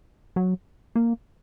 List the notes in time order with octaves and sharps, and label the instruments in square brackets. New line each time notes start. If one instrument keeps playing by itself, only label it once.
[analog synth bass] F#3
A#3